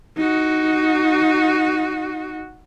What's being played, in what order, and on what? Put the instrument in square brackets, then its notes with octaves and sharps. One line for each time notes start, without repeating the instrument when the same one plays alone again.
[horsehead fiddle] D#4 F#4